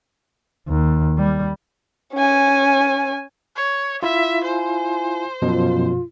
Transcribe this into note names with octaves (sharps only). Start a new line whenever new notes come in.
D#2
G3
C#4 G#5
C#5
E4 F4 E5
C5 G#5
F#2 B2 F3 F4